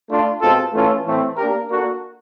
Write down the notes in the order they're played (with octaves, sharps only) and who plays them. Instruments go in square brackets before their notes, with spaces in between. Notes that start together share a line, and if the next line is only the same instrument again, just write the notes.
[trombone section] A3 D4 F4
B2 G#3 C4 F4 A4
E3 A3 C#4 F4 A4
A2 E3 A3 C4
A#3 D4 G4 A#4
A#3 D4 F#4 A4